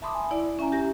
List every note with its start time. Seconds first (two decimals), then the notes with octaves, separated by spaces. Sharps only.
0.02 E5 A5 B5 C6 D6 D#6
0.14 G#5
0.31 E4 D5
0.59 C#4 E5 G#5 A#5
0.72 G4 A#6